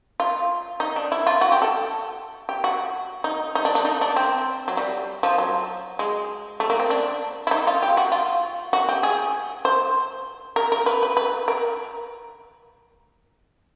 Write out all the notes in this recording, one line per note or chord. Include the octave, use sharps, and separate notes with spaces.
F4
D#4
D4
E4
F4
F#4
G4
A4
G4
F#4
D#4
D#4
D4
D4
D#4
D4
C4
F#3
G3
F3
F#3
G#3
A3
A#3
C4
D4
E4
D#4
F4
G4
F#4
F4
F#4
G4
G#4
C5
A#4
A#4
B4
B4
B4
A#4